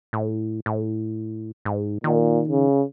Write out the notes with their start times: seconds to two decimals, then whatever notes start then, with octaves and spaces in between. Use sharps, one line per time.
0.13 A2
0.66 A2
1.65 G#2
2.04 A#2 D#3
2.49 C#3